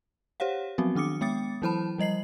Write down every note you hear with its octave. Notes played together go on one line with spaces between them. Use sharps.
G4 C5 C#5 F5 F#5
F3 F#3 B3 C4 F#4
D#3 D4 D6 D#6 C#7
G#3 B3 G5 D#6 A6 C#7
E3 F#3 E4 C5 A5 B5
F3 G3 D#5 C7 F#7